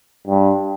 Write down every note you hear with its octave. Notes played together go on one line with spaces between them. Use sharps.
G2